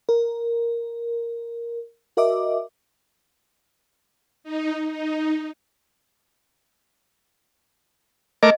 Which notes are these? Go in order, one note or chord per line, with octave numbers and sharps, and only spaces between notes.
A#4
F#4 A#4 D#5 E5 D6
D#4
D#4
A3 A#4 D#5 D6